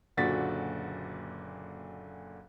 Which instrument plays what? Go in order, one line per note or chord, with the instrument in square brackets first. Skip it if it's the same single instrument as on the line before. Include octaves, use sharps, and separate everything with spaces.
[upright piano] F#1 A#2 D3 F#4 A6 B6